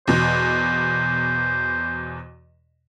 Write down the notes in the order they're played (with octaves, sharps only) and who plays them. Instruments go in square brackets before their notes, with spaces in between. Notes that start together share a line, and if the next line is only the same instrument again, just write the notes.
[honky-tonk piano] E2 B2 [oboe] C5